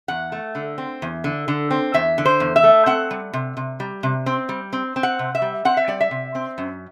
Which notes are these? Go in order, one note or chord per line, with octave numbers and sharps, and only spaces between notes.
E2 F#5
A3
D3
C4
E2
D3
D3
C4
E2 E5
D3
C5
E2
E5
A3
C4 F#5
G3
C3
C3
G3
C3
C4
G3
C4
C4
F#5
C3
E5
G3
C4 F#5
E5
G3 D5
E5
C3
C4
F#2